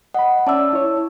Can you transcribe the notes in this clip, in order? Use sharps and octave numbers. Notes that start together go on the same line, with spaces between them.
D#5 F#5 B5
C#4 D5 E5 A5 E6
E4 C#5